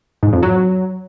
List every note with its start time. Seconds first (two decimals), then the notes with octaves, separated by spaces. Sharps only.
0.23 G#2
0.33 F2
0.43 F#3